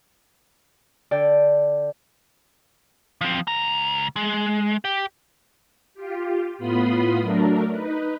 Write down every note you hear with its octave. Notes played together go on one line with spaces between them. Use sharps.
D3 D5 G5
F3 C4
C#2 A#5
G#3
G4
F4 G4
A2 B3 F4 B5 C6 D#6
F#3 A3 D4 A#4
D#4 B4